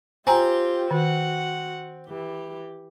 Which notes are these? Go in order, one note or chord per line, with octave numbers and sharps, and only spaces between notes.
C4 F4 G4 G#5 A#5
D#3 F#4 F#5
E3 G4